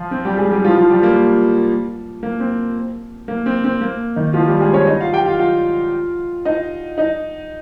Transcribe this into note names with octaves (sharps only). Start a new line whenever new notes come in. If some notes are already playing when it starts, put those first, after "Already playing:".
Already playing: F3 F4
C4
G3 G4
G#3 G#4
G3 G4
F3 F4
F3 F4
G3 G4
A#3
A#3
C4
A#3
C4
C4
A#3
D#3 D#4
F3 F4
G3 G4
G#3 G#4
C#4 C#5
D#4 D#5
F4 F5
G4 G5
F4 F5
F4 F5
D#4 D#5
D#4 D#5